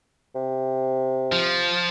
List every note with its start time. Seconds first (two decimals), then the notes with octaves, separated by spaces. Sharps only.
0.35 C3
1.32 F3